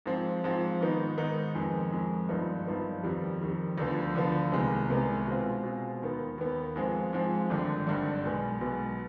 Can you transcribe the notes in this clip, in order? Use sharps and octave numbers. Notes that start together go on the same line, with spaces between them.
G#2 F3 C4
G#2 F3 C4
G#2 D#3 B3 D#4
G#2 D#3 B3 D#4
F2 D#3 G#3
F2 D#3 G#3
G#1 G2 F3 B3 D#4
G#1 G2 F3 B3 D#4
F2 D#3 G3
F2 D#3 G3
D2 D3 F3 B3
D2 D3 F3 B3
C2 C3 D#3 G#3 B3
C2 C3 D#3 G#3 B3
B2 G#3 C4 F4
B2 G#3 C4 F4
D#2 D#3 B3
D#2 D#3 B3
G#2 F3 G#3 C4
G#2 F3 G#3 C4
G#1 G2 D3
G#1 G2 D3
B1 B2 G#3 B3
B1 B2 G#3 B3